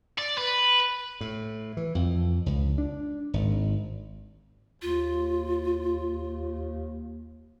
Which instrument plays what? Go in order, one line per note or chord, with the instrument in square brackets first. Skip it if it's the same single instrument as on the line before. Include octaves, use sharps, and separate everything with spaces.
[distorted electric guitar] D5
B4
[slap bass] A2
E3
F2
C#2
D4
G#1
[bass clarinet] D#2 [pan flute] F4